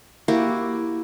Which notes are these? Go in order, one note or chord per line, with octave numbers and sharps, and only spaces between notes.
A#3 E4 F#4 G4